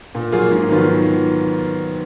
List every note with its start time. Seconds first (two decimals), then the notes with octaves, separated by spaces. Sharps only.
0.15 A#2
0.32 F#3 A#3 F4 G#4
0.51 G#2
0.69 D#3 F#3 B3 F4